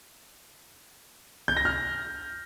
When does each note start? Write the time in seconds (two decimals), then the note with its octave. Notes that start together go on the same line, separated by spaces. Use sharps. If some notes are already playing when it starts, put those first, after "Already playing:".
1.48 G6
1.57 A#6
1.65 F6